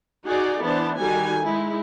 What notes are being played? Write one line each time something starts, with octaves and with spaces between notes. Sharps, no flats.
D#4 F#4 G#4 D5
E3 B3 D4 E4 C5 A5
D#3 G3 D#4 F#4 A4 G#5
G#3 D#4 E4